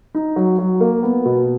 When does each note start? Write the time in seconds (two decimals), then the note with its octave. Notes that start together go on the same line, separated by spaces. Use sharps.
0.15 D#4
0.36 F#3
0.59 F#3
0.81 A#3
1.03 B3
1.25 B2